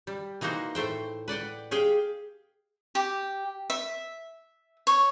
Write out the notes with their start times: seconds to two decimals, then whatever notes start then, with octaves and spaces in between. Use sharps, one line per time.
0.07 G3
0.41 E3 A#3 D#4 F#4 C5
0.75 A2 A3 C5 G5
1.28 B4 D5 F#5 G5
1.71 G4 G#4 F5 G5
2.95 G4
3.70 E5
4.87 C#5